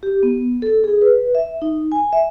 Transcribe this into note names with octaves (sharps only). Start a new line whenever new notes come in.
G4
B3
A4
G#4
B4
E5
D#4
G#5
E5